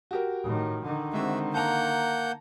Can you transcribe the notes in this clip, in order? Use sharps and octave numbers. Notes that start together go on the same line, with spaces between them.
F#4 G4 A#4
A2 D#3
D3 D#3
G#3 C4 F#4 E5
A#3 F#5 A5 A#5 G6